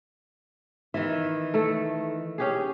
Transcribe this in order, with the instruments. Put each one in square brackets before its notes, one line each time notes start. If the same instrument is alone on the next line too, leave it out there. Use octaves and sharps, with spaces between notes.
[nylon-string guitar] D#3 E3 [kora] E5
[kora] A3 A4
C#4 G4 G#4